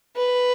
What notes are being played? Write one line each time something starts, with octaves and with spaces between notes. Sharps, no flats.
B4